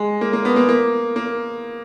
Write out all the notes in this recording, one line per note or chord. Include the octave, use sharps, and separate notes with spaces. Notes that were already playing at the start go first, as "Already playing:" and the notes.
Already playing: G#3
A#3
A#3
B3
A#3
A#3
A#3